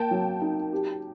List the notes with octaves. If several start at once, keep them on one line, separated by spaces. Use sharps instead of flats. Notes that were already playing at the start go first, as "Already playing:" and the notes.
Already playing: A#3 G5 A5
F#3
D#4
G4